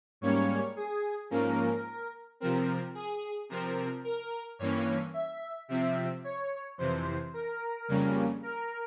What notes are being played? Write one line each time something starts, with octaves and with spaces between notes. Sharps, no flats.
G#2 G3 A#3 C#4 C#5
G#4
G#2 F3 A#3 C#4 A#4
C3 F3 C4 A#4
G#4
C3 F3 C4 A#4
A#4
G2 E3 A#3 C#4 C#5
E5
C3 F3 C4 E5
C#5
F2 C3 E3 C5
A#4
F2 C#3 G3 A#3 C#4
A#4